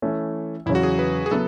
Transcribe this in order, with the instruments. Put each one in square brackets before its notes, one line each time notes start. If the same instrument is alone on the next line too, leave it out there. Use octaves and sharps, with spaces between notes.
[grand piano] E3 A3 C#4
[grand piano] E2 C#3 F#3 C#4 [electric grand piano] E4
[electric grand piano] F#4
G#4
B4
G#4
[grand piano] C#3 F#3 B3 E4 [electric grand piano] A4